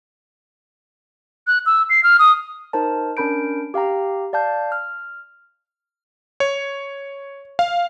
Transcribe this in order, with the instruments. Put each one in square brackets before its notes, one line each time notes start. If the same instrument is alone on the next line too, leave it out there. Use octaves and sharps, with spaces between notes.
[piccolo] F#6
E6
C7
F6
D#6
[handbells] D#4 A#4 C5 A5
C#4 D4 A#4 B5 G6 D7
G4 F5 G5 A#5
D5 F5 A5 G6
F6
[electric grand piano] C#5
F5